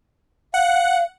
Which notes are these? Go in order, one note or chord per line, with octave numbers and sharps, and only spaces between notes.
F5 F#5